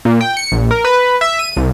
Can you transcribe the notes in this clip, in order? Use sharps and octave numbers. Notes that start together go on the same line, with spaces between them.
A#2
G5
C#7
A#1
A#4
B4
E5
D#7
C2